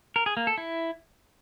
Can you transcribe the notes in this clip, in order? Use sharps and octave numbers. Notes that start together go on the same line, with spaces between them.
A#4
G#4
A#3
A4
E4